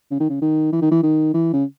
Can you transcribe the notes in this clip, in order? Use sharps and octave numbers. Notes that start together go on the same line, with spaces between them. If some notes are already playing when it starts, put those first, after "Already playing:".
C#3
D#3
C#3
D#3
E3
D#3
E3
D#3
E3
C#3